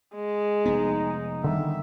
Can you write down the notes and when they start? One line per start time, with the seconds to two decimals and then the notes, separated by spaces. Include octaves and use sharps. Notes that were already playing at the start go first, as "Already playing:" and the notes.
0.15 G#3
0.66 F1 B3 D#4
1.44 D3 D#3 G3 E5